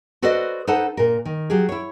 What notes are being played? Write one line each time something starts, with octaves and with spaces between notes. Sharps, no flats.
F#4 A4 B4 C5 D5 D#5
D#4 A4 B4 C5 F#5 A5
A#2 A#4
D#3
F#3 G4 G#4
E4 C#5